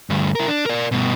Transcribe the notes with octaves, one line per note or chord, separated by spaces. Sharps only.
D2 G2
E4 A#4
D4
A#4 D5
G2 B2